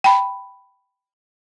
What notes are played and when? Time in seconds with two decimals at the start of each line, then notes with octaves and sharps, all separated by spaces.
0.04 G5 A5 B5